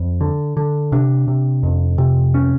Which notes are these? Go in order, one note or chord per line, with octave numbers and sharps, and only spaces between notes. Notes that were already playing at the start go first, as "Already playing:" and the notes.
Already playing: F2
D3
D3
C3 D4
C3
F2
C3
C#4